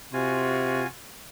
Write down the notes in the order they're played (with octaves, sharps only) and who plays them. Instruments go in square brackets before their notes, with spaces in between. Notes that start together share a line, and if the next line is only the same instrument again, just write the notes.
[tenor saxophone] C3 [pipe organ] F4 F#4 G#5